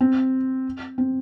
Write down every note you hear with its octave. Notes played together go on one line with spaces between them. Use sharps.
C4
C4